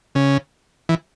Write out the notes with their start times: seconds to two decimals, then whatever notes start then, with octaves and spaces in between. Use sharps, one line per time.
0.15 C#3
0.89 E3